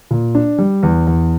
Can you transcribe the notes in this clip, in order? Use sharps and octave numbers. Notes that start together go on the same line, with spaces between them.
A#2
D4
G3
E2
E2